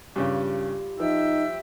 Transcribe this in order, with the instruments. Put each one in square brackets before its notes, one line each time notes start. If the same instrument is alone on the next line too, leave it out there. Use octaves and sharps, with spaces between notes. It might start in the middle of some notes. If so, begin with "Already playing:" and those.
[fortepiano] G2 C#3 [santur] G3 F4
[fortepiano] F3 [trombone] D#4 [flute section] E5 G5 E6